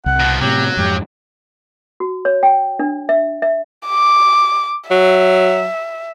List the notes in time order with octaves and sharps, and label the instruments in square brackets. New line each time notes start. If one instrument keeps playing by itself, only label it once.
[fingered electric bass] C2 [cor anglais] F#5
[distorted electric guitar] B2 F3
[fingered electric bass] A2 C3 [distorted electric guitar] F#3 [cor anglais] G4
[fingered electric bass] F2 G#2 [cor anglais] G4
[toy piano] F#4
C#5
G5
D4
E5
E5
[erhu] D6
[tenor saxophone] F#3 [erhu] E5